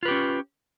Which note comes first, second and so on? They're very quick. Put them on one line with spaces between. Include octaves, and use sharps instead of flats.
F4 B4 G4 C#4